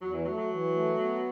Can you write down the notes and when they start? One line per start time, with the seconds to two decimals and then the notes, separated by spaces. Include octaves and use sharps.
0.01 E2 F#3
0.13 E3
0.25 F#3 A3
0.37 F#3
0.49 E3
0.74 A3
0.98 B3